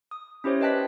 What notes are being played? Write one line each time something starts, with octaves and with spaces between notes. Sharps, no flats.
D#6
C#4 E4 G4 C5 C#5
B4 D#5 G5 A5 F#6 B6